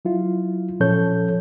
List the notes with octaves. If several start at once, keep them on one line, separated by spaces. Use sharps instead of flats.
F#3 E4 F4
A#2 F3 C#4 A4 C#5 G6